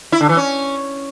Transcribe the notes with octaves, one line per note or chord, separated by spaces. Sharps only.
E4
D3
E3
C#4